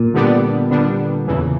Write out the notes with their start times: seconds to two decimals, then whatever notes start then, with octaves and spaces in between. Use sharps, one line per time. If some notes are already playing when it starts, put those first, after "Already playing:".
Already playing: A#2
0.14 D3 G3 B3 D4
0.70 D3 G3 B3 D4
1.27 E2 C#3 E3